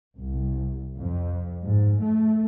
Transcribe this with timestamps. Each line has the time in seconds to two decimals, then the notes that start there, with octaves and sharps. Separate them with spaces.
0.17 C2
0.96 F2
1.62 G#2
1.99 A3